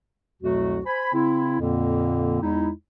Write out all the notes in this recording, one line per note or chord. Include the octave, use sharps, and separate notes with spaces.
C2 F2 B2 F#3 A3 F#4
C5 G#5 B5
C#3 C4 E4
F2 A#2 D3 A#3
E2 G#3 D#4 E4